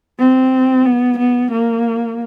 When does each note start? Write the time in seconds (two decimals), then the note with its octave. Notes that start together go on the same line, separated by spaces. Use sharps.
0.19 C4
0.86 B3
1.19 B3
1.52 A#3